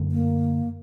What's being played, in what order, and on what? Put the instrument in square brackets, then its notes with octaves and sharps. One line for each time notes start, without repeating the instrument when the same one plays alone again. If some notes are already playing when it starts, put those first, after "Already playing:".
Already playing: [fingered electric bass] F#2 D3 A3
[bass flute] A#3